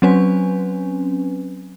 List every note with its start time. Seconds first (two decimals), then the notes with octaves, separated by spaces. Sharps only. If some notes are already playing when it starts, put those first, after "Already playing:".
0.02 F#3 C4 C#4 B4 G#5